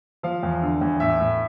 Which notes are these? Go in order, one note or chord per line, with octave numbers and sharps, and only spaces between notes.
F3 F5
E2
D3
E2
A2 E5
A2